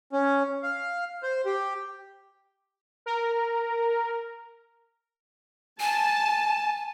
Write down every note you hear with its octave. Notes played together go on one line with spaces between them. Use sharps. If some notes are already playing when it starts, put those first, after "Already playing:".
C#4
F5
C5
G4
A#4
G#5 A5